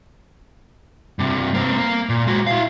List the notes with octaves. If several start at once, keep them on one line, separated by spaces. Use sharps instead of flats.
G2 C3
A#3 C4
A#3
A#2
G#3 F#4
E4 F5